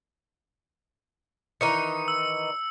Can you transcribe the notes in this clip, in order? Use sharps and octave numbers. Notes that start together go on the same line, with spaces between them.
D#3 E3 D#4 C#7
E6